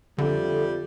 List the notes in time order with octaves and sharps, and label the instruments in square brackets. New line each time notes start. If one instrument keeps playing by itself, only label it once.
[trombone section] F2 [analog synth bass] D3 [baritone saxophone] G3 [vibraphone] A4 E5